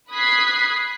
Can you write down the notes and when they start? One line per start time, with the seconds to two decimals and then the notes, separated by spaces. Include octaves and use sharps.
0.11 B5 D#6 F#6 G#6 B6 C7